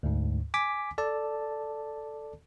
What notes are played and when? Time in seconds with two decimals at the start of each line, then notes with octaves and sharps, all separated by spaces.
0.03 D2 G#2
0.54 G#5 D6 B6
0.98 A4 D5 A5